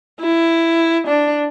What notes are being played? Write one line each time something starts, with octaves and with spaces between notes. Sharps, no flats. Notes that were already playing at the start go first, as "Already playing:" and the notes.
E4
D4